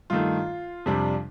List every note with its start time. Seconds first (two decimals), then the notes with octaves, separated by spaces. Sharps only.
0.10 G2 D#3 A3 F4
0.86 F2 C3 G3 D4